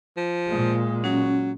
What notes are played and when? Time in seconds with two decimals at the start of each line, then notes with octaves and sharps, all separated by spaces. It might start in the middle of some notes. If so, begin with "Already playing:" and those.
0.17 F3
0.48 A#2 G#3
1.04 F#3 C#4